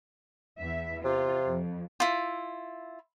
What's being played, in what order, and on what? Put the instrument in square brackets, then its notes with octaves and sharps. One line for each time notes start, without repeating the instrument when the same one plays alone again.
[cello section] E2 E3 E5
[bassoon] C3 [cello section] F4
[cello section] F2
[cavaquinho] E4 F4